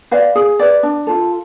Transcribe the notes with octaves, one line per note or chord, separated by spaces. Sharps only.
B4 D5 F5
G#4
B4 D5
D4
F4 A4